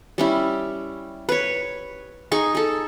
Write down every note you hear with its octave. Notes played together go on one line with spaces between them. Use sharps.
G3 C#4 E4
B4 C#5
D#4 G#4 C#6
G#4 A4